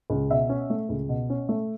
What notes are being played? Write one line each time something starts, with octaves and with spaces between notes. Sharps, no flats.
C#2
B2 E5
C#4
A3
C#2
B2
C#4
A3